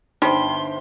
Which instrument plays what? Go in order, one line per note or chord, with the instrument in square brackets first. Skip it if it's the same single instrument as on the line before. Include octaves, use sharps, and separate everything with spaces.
[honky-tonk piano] G1 C5 [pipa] G3 [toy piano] D#4 [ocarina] C6